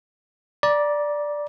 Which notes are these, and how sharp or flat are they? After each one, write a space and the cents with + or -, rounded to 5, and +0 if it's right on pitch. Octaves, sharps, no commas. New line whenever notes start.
D5 +0 A#5 +35